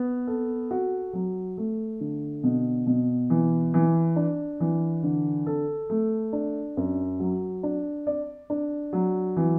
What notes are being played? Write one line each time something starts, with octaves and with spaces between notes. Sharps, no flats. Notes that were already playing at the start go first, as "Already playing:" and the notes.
Already playing: B3
A4
F#4
F#3
A3
D3
B2
B2
E3
E3
D4
E3
D3
A4
A3
D4
F#2
F#3
D4
D5
D4
F#3
E3